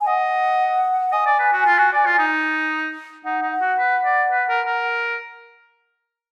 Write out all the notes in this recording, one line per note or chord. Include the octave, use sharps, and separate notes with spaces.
G#5
D#5 F#5
D#5 G#5
D5
B4
F#4
F4
F#4
D5
F4
D#4
D#4 F#5
D#4
F#5
F#4
B4
D5
B4
A#4
A#4